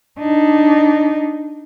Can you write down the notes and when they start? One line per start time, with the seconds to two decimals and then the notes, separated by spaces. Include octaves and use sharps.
0.20 D4 D#4